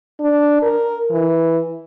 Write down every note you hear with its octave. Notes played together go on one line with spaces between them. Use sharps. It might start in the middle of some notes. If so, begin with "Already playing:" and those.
D4
A#4
E3